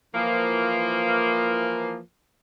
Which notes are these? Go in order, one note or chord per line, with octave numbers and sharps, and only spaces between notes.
E3 F3 A#3